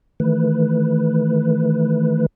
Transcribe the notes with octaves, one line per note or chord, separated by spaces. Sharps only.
D#3 E3 A3 B4